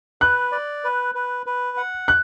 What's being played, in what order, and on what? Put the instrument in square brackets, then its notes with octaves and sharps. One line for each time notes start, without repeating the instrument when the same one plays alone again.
[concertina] B4 [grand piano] F#6
[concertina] D5
B4
B4
B4
F#5
[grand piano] F#6